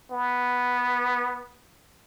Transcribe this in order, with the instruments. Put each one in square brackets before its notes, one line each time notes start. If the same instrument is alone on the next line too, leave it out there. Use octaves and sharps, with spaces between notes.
[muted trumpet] B3